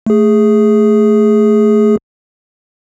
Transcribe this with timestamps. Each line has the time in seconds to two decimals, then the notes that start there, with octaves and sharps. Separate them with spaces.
0.07 A3 G#4